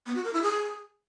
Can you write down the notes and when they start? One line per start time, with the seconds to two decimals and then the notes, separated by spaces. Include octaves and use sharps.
0.06 B3
0.15 F#4
0.24 A#4
0.33 E4
0.42 G#4